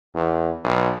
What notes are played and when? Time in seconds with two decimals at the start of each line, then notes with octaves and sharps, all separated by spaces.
0.15 E2
0.64 B1